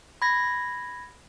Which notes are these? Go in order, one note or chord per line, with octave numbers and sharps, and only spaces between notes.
B5 G#6 A#6